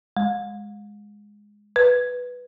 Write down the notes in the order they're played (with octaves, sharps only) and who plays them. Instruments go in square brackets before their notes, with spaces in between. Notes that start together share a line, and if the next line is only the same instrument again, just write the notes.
[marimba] G#3
B4